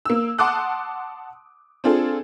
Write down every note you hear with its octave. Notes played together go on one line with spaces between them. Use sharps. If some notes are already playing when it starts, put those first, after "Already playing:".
A#3 E6
F#5 A5 C6 D6 D#6 F#6
C4 D4 F4 G#4 A4